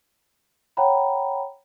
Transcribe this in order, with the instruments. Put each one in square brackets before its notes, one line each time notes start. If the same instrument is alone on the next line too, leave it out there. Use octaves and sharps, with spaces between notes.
[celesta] C#5 F#5 G5 A#5 B5